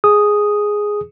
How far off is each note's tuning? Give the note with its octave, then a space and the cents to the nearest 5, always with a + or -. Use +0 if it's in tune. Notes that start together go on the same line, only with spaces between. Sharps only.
G#4 +0 D#6 +0